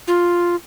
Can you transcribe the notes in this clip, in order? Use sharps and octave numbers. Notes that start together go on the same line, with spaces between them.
F4